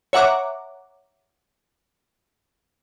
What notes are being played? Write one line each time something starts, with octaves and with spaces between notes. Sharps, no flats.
C#5 E5 F#5 A#5 D6 F#6